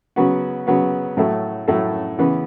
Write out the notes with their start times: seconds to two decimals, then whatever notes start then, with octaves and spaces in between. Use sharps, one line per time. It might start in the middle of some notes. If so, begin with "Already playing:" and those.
0.16 C#3 F#3 B3 F#4
0.67 C#3 F#3 B3 F#4
1.17 A2 F#3 A3 E4 A4
1.68 A2 F#3 A3 E4 A4
2.19 C#3 E3 B3